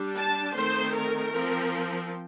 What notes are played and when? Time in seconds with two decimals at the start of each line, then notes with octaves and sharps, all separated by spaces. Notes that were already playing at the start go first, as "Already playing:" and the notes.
Already playing: G3 D4
0.17 A5
0.56 D#3 A3 C4 C5
0.95 A#4
1.32 F3 C4